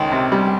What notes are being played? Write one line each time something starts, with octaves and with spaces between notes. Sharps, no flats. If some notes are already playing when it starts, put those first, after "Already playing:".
Already playing: C#2 D#3
C3
G3